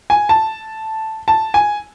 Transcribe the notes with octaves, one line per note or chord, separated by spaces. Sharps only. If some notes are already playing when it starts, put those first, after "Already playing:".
G#5
A5
A5
G#5